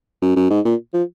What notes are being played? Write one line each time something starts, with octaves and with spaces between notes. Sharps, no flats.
F#2
F#2
G#2
A#2
F3